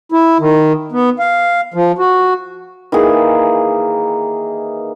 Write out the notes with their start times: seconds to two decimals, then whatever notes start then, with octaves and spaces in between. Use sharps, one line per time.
0.12 E4
0.40 D#3
0.92 B3
1.19 F5
1.74 F3
1.99 F#4
2.92 D#3 E3 A#3 G#4